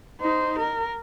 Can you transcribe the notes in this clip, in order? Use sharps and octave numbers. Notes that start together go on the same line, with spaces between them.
D#4 C5
A#4